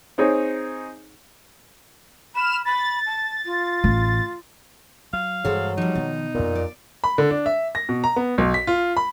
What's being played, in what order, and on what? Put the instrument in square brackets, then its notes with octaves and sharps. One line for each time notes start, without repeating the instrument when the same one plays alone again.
[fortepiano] C4 D#4 G#4 C#5
[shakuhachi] B5 [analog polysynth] F6 E7
[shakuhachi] B5 [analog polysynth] A6
[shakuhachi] A5
F4
[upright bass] A1
[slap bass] F#3 [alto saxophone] F5
[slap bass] G2 E3 G#3 [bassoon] F#3 [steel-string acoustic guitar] G#4 A4 C5
[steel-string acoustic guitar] F3 G3 [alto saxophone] D#4
[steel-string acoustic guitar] B2 [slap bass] D#3 F3
[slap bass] F2 B3 [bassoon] A#2
[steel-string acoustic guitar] D5
[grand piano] B5
D3
D4
E5
A#6
B2
A#5
B3
B1
B6
F4
B5